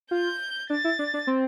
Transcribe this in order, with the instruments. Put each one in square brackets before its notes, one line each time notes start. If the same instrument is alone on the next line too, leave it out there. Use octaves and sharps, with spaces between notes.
[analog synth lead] F4 [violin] G6
[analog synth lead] D4 [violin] A6
[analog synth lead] E4
D4
D4
C4